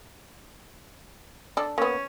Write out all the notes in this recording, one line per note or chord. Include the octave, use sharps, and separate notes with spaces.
D4 A4
A#3 B3 C#4